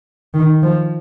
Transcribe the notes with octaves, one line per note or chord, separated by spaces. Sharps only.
D#3
F3